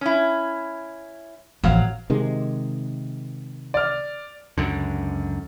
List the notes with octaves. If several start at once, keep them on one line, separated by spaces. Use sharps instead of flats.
C#4 E4
A1 F2 F#3 F5
C3 D#3 G#3
D5 F6
C#2 F#2 D3